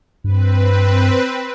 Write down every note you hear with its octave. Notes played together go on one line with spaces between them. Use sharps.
G2 C4 B4